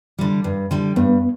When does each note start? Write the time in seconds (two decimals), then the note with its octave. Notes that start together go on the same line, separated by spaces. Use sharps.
0.19 D3 G3
0.44 G2
0.71 D3 G3
0.96 G2 B3